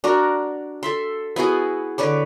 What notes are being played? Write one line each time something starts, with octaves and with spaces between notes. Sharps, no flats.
D4 F#4 A#4
A4 E5 C6
B3 E4 F#4 G#4
D3 B4 C#5 D6